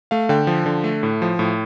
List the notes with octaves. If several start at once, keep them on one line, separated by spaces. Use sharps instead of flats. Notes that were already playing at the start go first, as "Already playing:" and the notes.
A3 F5
D3 G5
F3
D3
A3
A2
F3
A2